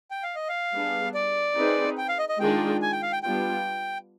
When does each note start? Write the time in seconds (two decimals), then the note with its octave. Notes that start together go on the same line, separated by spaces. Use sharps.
0.11 G5
0.23 F5
0.36 D#5
0.49 F5
0.74 G3 B3 D4 G#4
1.14 D5
1.56 C4 D#4 G#4 B4
1.98 G5
2.09 F5
2.19 D#5
2.29 D#5
2.40 D#3 G#3 D4 F4 G#4 G5
2.82 G#5
2.92 G5
3.03 F5
3.12 G5
3.23 G3 B3 D4 F4 G5